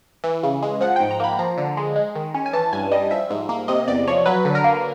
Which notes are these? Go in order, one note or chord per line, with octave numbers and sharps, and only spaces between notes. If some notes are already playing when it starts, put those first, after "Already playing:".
E3
C#3
G#3
F3 F#5
G#2 G5
A#5
A#3 B5
F3 A#5
D3
G#3
G#3
D#3
C#4
G#5
E3 A5
G2 G#5
G3 D#5
F3 E5
G#2
A#3
C3 D#5
E2 D5
F3 C#5
F#3 B4
D3
A#4
A#3